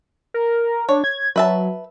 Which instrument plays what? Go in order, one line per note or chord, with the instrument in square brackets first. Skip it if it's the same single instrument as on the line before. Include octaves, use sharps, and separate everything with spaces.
[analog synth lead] A#4
[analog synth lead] D4 [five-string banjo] C#5
[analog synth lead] G#6
[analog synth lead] F#3 [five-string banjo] B4 E5 A5